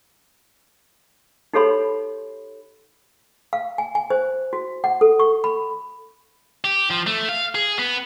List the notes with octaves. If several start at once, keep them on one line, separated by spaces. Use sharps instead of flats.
D#4 G4 A4 C#5 B5 C6
F5
G#5
G#5
C5
F#4
F#5
A4
C#6
B5
G4
F3
A3
F5
G#4
B3